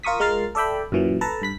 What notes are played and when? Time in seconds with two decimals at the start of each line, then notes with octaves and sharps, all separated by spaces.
0.03 F4 A#4 C#6 D#6 B6
0.20 G#3 F4 A#4 F6 A6 C7
0.55 A4 D5 E5 G5 B5
0.92 F#2 A#2 E3 F#3
1.21 A4 B4 A5 A#5
1.42 G2 B5 B6